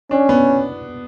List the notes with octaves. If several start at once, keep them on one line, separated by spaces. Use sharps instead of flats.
C#4 D4
B3